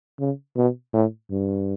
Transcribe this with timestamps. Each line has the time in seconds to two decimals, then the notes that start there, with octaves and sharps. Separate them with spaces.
0.20 C#3
0.56 B2
0.93 A2
1.31 G2